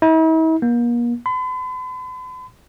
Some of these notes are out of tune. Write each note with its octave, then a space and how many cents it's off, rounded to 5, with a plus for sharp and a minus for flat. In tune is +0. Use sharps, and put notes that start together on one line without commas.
E4 -45
A#3 +40
B5 +45